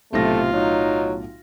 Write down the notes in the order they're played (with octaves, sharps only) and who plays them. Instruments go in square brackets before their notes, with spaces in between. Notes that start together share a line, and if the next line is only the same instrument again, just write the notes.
[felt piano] B1 A2 A#6 [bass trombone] C3 [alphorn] A3 [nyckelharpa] F4
[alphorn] F#3 [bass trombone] D#4